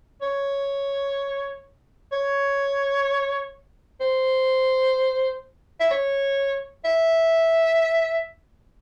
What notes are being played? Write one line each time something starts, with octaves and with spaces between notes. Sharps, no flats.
C#5
C#5
C5
E5
C#5
E5